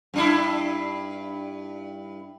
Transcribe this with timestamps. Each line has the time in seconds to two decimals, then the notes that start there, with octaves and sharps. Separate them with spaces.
0.14 G2 D4 E4